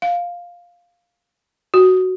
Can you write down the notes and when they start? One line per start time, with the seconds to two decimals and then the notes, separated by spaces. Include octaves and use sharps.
0.02 F5
1.74 F#4